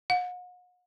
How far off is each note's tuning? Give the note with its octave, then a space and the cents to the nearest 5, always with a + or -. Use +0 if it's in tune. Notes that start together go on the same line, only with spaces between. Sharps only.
F#5 -40